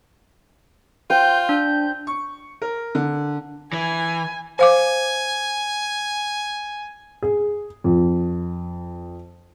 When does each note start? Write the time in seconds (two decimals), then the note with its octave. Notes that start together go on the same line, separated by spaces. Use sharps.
1.10 F4 C5 G5 G6
1.49 D4 G6
2.07 C#6
2.62 A#4
2.95 D3
3.73 E3 G#5
4.59 C5 F5 G#5 D6
7.23 G#4
7.84 F2